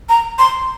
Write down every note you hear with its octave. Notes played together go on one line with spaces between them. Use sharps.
A#5
C6